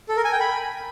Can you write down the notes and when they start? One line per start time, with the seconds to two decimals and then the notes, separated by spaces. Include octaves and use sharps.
0.09 A4
0.17 A#4
0.25 G#5
0.32 G5
0.40 B5